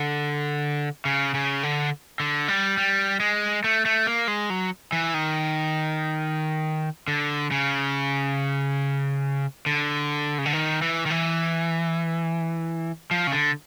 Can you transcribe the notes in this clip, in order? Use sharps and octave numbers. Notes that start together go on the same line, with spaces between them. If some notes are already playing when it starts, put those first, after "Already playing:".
Already playing: D3
C#3
C#3
D3
D3
G3
G3
G#3
A3
A3
A#3
G#3
F#3
E3
D#3
D3
C#3
D3
C#3
D3
D#3
E3
D#3
E3
F3
C#3
D3